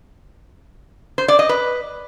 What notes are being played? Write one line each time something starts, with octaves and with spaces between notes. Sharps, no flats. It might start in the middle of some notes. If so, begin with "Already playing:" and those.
C5
D5
D#5
B4